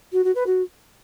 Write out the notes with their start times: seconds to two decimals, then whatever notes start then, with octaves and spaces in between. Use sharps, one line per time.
0.12 F#4
0.24 F#4
0.35 B4
0.46 F#4